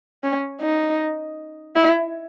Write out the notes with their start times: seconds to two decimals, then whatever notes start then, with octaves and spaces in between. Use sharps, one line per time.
0.24 C#4
0.62 D#4
1.76 E4